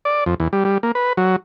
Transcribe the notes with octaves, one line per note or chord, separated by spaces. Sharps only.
D5
F2
E2
G3
G3
A#3
B4
F#3